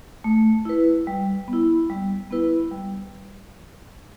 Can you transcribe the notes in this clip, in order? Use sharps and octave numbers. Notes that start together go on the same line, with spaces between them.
A3
E4 B4
G3
B3
E4
G3
B3 E4 B4
G3